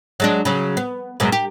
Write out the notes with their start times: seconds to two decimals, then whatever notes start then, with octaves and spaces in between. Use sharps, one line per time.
0.20 F#3 G#3 D4
0.45 C#3 F#3
0.77 B3
1.20 F#2 B2 G#3
1.32 G4